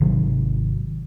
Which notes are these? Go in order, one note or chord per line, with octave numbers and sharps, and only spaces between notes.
G#1 C3 D#3 F#3